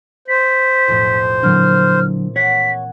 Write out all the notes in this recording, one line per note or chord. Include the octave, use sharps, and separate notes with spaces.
C5 B6
B1 F2 A2
A#2 D3 E3 F#3 C4 F6
C#5 F#5 G#5 B6